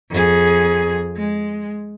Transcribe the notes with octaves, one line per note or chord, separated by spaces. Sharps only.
F2 G#4
G#3